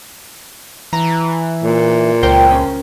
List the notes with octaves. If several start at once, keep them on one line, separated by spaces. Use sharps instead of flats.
E3 A#5
A#2
C#2 A#4 C5 G5
C#4